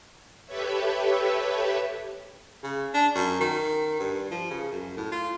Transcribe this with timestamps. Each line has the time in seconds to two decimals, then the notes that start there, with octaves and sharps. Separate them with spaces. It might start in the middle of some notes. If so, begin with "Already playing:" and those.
0.46 G4 A4 B4 C#5 E5
2.63 C#3
2.94 D4
3.15 F#2
3.41 D#3
4.00 G2
4.31 F3
4.50 C#3
4.71 F#2
4.97 A2
5.12 F4